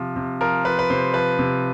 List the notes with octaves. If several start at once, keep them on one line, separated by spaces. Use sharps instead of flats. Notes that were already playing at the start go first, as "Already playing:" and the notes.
Already playing: C3 F3
C3
F3 A#4
F3 B4
B4
C3 C5
F3 B4
C3